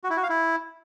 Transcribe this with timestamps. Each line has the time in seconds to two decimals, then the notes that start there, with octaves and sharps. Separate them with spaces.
0.04 F#4
0.10 E4
0.17 F#4
0.23 F5
0.30 E4